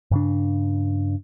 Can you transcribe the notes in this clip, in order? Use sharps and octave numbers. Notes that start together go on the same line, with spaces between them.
G2 C#3 D4